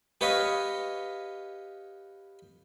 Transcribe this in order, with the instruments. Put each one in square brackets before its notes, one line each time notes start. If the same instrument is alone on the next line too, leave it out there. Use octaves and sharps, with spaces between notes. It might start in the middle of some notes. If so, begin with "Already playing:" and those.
[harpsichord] G4 B4 C#5 D#5 F5